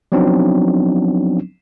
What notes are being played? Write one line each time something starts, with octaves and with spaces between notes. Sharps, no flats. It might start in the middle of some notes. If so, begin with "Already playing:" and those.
F3 F#3 B3 C4 D4 D#4